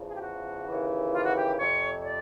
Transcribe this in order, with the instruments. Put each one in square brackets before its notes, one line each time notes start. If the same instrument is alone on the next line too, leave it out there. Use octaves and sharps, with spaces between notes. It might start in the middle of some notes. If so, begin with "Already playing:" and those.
Already playing: [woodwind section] E2 C#3 F3
G#4
G4
F#4
D#2 C#3 E3
F4
F#4
G4
F2 C3 F3 C#5
C#5
D5